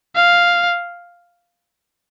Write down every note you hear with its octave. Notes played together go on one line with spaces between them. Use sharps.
F5